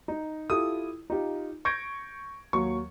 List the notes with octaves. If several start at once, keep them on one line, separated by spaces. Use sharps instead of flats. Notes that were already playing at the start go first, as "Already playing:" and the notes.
D#4
E4 F4 G4 A4 D#6
D#4 F4 G4
C#6 G6 G#6 A#6 D7
D#2 F#3 C#6